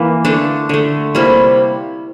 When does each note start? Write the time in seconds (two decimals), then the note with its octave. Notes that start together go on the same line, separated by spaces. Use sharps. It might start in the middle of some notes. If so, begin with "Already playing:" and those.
Already playing: E3 A#3
0.25 D3 A3 D4
0.69 D3 A3
1.15 C3 G3 A#3 E4